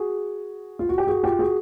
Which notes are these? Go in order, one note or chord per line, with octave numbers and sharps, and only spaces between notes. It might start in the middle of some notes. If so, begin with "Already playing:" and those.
Already playing: F#4 G#4
F4
F#4
G4
F#4 G#4
F4 G4
F#4 G#4